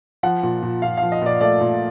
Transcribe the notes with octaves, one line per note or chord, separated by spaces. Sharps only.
F3 F#5
A#2
A#2
A#2 F5
F3 F5
D#5
A#2 D5
A3 D5
A#2